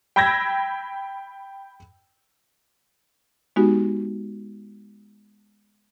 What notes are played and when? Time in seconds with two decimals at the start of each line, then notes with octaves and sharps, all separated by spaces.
0.16 G5 B5 E6 G6 G#6 A#6
3.56 G#3 B3 D#4 F#4 G4